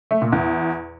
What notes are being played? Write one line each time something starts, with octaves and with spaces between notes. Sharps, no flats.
A3
A#2
E2